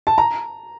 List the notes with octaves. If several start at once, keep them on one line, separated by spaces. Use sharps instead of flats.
A5
A#5